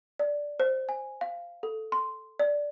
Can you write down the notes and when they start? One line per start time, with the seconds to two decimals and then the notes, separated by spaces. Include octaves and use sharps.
0.19 D5
0.60 C5
0.89 G#5
1.21 F5
1.63 A4
1.92 C6
2.39 D5